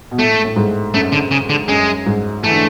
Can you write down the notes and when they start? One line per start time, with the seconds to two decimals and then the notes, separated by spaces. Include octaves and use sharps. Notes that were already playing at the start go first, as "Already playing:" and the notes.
0.11 B2
0.19 A2 A3
0.45 A2
0.56 G#2
0.94 F#2 A3
1.12 D3
1.31 C#3
1.50 D3
1.68 F#2 G#3
2.06 G#2
2.44 E3 A3
2.51 D3